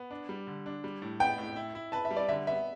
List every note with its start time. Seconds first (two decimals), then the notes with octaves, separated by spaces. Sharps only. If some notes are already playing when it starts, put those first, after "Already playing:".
Already playing: B3
0.11 D4
0.29 G3
0.47 D3
0.66 D4
0.84 G3
1.02 A2
1.20 B3 G5
1.38 A2
1.56 E4
1.75 E4
1.92 B4 A5
2.05 E5
2.11 G3
2.16 D5
2.28 D3 E5
2.47 B3 E5